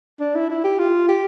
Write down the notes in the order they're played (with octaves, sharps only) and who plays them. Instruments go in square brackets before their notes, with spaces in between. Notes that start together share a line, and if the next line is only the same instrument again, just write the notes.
[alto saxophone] D4
E4
E4
G4
F4
G4